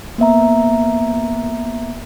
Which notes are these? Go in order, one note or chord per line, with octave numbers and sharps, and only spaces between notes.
A#3 B3 E5 A#5